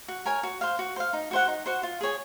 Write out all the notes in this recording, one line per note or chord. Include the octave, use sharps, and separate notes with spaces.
F#4
A#4 C#5 G#5
F#4
C5 F5
F#4
C5 F5
D#4
F#4 C5 F#5
D#4
F#4 C5 F#5
F4
G#4 C#5 G#5